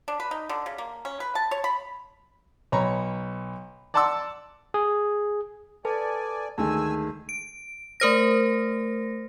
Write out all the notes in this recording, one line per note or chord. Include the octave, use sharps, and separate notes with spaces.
D4
B4
D#4
D3
C#3
A#3
C#4
B4
A5
C#5
B5
B1 C#5 A#5 B5 C#6
D5 F#5 A5 C6 D6 E6
G#4
A4 B4 D5 G#5 A5
D2 D#3 G#3 G#5 A5 E6
D7
A3 A#4 C5 A#6